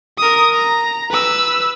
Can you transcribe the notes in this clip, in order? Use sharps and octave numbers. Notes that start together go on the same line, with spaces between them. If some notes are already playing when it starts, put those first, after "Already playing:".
A#4 D#6
A#5
B4 E6